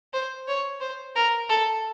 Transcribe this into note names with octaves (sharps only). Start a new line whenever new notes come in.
C5
C#5
C5
A#4
A4